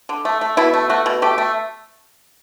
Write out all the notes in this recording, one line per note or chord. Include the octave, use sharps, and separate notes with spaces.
D3
A3
A3
B2 E4
A3
A3 F#4
B2
A3 G4
A3